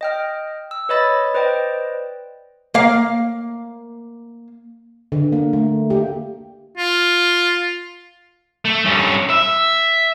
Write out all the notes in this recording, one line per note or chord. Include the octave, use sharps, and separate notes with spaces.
D#5 G5 F6
E6
B4 C#5 D#5 B5 A6
B4 C5 D5 D#5 G5
A#3 F5
D3
A#3
A3
G4
F4
A3
G2 C#4
E5